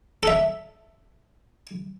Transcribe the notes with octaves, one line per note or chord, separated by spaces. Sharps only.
A4 E5